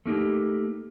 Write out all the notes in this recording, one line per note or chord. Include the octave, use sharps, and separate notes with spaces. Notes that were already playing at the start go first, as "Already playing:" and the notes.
A3 A#3 D#4 G4